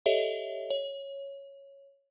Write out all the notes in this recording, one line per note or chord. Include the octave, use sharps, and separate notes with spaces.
G4 A4 C#5 D#5 E5
C#5